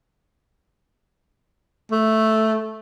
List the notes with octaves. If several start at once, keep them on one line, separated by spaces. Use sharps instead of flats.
A3